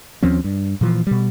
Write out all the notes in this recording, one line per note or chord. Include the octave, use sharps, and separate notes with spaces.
D#2 F3 C4 C#4
G2
A#2 E3 F3
B2 G3